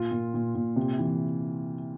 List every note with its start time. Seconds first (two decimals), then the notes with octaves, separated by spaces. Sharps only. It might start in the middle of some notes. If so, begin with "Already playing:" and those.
Already playing: A#2 F4
0.12 A#2
0.34 A#2
0.55 A#2
0.76 C3
0.99 E3